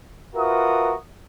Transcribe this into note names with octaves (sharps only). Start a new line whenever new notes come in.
F4 F#4 A#4 B4 E5 D#6